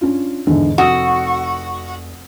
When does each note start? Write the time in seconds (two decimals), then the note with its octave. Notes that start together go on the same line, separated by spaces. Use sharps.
0.01 C#4 D4 F4
0.47 E2 G#2 D3
0.78 F1 F#4 D#6 E6